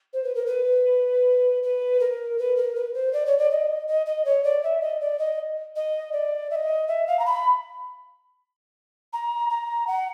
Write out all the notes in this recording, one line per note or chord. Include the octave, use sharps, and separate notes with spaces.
C5
B4
A#4
B4
B4
A#4
B4
A#4
B4
C5
D5
C#5
D5
D#5
D#5
D#5
C#5
D5
E5
D#5
D5
D#5
D#5
D5
E5
D#5
E5
F5
A#5
B5
A#5
A#5
F#5